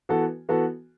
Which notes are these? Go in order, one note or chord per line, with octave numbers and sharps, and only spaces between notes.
E3 B3 F#4 A4
E3 B3 F#4 A4